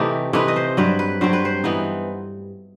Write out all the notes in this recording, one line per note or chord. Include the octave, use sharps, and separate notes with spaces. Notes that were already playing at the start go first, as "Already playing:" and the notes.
Already playing: C3 E3 A3 D#4 G4
C3 E3 A3 D#4 B4
D#5
C5
G2 F#3 C4 B4
B4
G2 F#3 C4 C5
B4
C5
E3 B3 D#4